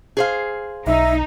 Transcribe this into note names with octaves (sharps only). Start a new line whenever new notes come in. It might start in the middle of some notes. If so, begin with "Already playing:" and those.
G#4 C5 F5
B1 D#4 E5